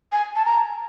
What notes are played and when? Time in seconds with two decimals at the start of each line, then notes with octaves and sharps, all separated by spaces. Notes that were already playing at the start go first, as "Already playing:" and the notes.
0.12 G#5
0.36 A5
0.45 A#5